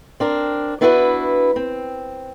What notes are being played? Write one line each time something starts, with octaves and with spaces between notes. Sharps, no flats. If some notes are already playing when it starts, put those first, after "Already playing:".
C4 D4 A#4
B3 D4 E4 F#4 G#4 B4
C4